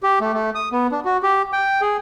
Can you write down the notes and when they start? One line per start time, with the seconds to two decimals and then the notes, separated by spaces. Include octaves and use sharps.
0.03 G4
0.21 A3
0.34 A3
0.55 D#6
0.72 B3
0.92 D4
1.05 F#4
1.23 G4
1.53 G5
1.81 G#4